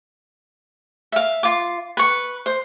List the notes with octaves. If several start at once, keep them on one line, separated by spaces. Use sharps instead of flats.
E5 F5
F4 D6
B4 C#6
C5